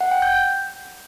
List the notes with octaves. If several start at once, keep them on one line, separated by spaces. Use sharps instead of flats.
F#5
G5
G6